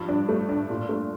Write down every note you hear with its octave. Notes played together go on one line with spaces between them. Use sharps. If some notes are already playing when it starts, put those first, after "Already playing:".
Already playing: G2 F3
D4
A3
D4
A#2
A3